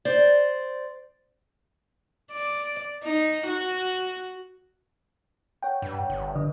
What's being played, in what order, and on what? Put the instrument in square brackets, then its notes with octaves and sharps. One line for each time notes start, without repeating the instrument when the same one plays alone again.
[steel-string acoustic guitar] C5 D5
[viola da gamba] D5
D#4
F#4
[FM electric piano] C#5 F#5 G5
[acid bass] G2
G1
[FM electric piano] D3 D#5